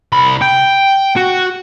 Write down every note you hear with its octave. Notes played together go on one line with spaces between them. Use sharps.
C2 B5
G5
F#4